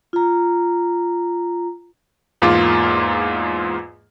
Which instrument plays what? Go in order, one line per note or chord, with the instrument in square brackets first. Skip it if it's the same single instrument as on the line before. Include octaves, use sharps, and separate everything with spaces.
[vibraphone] F4 A#5
[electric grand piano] E2 G#2 A#3 F4 D6